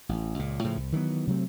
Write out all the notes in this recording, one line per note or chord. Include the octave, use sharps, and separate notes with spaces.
A1
C#2 A#2
A2 C#3 F3
C2
D#3 E3 F#3 B3
C3 F#3 A3 C4